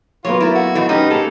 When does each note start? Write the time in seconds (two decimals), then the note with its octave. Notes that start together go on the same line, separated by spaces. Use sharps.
0.25 F#3 A#3 B3 F4 C#5
0.41 A3 E4 A#4
0.55 F#4
0.75 B2 E3 D#4 C5
0.89 C#4 D#4 G4 B4
1.10 A#3 G#4 A4 F5